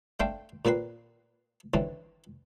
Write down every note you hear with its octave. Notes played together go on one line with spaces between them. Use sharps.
A3 C4 D4 C5 F5 G5
A#2 A#3 C4 B4 C6
D3 E3 C4 C#4